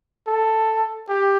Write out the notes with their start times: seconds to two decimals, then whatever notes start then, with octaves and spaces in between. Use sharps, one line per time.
0.27 A4
1.09 G4